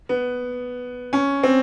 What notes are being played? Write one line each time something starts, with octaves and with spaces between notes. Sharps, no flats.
B3
C#4
C4